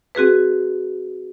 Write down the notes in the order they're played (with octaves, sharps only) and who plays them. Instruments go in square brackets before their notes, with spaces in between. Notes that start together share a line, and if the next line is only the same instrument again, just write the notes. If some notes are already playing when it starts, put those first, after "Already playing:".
[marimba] C4 F#4 G#4 B4